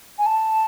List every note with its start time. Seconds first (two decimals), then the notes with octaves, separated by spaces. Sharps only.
0.18 G#5
0.26 A5